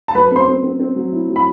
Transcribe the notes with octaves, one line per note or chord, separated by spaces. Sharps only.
A5
F#3 B4 B5
C4 C5 C6
C4
C4
C4
F#3
E4
F#3
B5